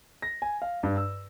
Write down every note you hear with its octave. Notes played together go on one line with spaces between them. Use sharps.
A#6
G#5
F5
G2
E6